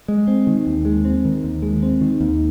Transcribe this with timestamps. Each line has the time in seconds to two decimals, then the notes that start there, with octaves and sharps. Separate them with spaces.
0.08 G#3
0.28 C4
0.47 D#3
0.67 D#2
0.85 G#3
1.05 C4
1.25 D#3
1.44 D#2
1.62 G#3
1.83 C4
2.01 D#3
2.21 D#2